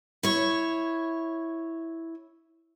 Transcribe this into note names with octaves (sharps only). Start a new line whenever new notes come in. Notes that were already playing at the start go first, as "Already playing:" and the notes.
E4 C#5